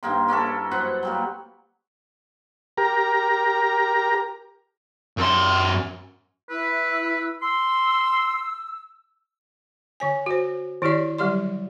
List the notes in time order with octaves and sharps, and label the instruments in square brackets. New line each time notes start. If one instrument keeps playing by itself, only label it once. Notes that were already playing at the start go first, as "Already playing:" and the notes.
[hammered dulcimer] G2 D#3 A#3 C6
A#3 C#4 E4 A4
F#2 B4 C5 F#5
F#3 G3 A#3
[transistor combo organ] G4 A#4 A#5
[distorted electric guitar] F#2 C6
[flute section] E4 E6 [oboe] B4
[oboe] C6 [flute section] E6
[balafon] D3 C#5 G#5
F#4 C5
D#3 E4 G4 C#5 D5
D3 F#3 G3 G4 D5 C6